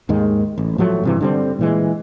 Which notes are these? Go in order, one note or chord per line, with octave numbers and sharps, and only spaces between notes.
D#2 G#2 D#3 G#3
A1
A2 F3 F#3 A3
G2 C3 E3
D3 G3 C4
A#2 E3 G#3